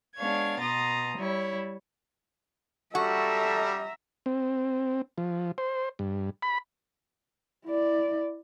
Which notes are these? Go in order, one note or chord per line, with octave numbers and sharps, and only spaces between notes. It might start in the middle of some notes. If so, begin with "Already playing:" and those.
G#3 B3 D4 C#5 F5 G#6
B2 A#5 C6 D#6 A6
G3 E4 C#5
G3 F#4 A4 E5 A#5
C4
F3
C5
G2
B5
E4 D5